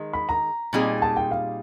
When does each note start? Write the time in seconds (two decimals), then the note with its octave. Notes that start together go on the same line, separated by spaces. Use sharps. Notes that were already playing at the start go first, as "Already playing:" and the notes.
Already playing: D#3 G#3
0.13 B5
0.29 A#5
0.73 A#2 G3 C4 D#4 G#4
1.02 A5
1.16 G5
1.31 F5